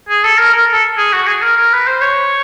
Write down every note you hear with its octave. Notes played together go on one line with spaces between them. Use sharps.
G#4
A4
A#4
A#4
A4
G#4
F#4
G#4
A#4
A#4
B4
C5
C#5